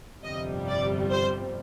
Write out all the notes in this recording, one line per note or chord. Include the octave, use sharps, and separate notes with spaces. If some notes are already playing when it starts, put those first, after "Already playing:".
G1 F2 C3 G3 D#5
D5
C5